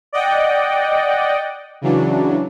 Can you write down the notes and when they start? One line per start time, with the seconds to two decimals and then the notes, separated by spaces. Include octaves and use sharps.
0.13 D5 D#5 F#5 G5
1.81 C#3 E3 F#3 D4